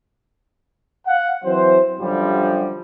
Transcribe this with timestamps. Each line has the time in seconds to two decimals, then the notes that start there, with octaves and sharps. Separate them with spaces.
1.07 F5 F#5
1.44 E3 F#3 C4 C5
2.00 F#2 D3 F3 G3